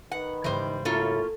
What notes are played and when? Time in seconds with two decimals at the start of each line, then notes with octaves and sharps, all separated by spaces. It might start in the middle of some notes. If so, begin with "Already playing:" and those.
0.11 D#3 B4 F#5
0.44 G#2 C#3 E3 G3 C5
0.85 F#3 A3 A#3 C#4 E4 F4 A4